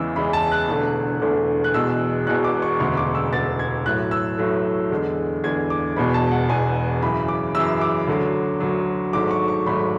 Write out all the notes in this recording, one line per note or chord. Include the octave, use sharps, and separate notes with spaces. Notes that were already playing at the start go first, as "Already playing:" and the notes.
Already playing: E2 C#3 E3 G#3 E6
E2 C#3 E3 G#3 B5
A5
F#6
E1 E2 D3 A3
E1 E2 D3 A3
F#6
E1 E2 B2 G#3 E6
E1 E2 B2 G#3 F#6
D6
C#6
E1 D2 C#3 G#3 C#6
D6
E6
E1 D2 C#3 G#3 A6
G#6
A1 A2 F#3 A3 F#6
E6
A1 A2 F#3 A3
E2 D3 G#3
E2 D3 G#3 G#6
D6
E1 E2 B2 G#3 B5
A5
F#5
E1 E2 B2 G#3 G#5
F#2 C#3 E3 B5
D6
F#2 C#3 E3 E6
D6
D2 D3 F#3
D2 D3 F#3
G#1 G#2 F#3 A3 D6
C#6
C#6
G#1 G#2 F#3 A3 B5